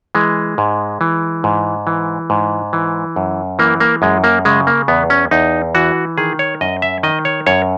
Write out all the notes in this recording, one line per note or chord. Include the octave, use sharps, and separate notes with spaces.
E3 G#3
G#2
E3
G#2
E3
G#2
E3
F#2
E3 A#3
A#3
F#2 G#3
A#3
C#3 G#3
A#3
E2 B3
C#4
E2 D#4
E3 F#4
D#3 G#4
C#5
F#2 D#5
E5
D#3 D#5
C#5
F#2 C#5